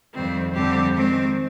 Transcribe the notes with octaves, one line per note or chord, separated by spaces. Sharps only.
F2 D#3 G3 C4
F2 D3 G3 C4 G4
D#3 G#3 C4